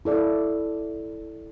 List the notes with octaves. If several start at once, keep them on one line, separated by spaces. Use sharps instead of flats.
E4 A4 D5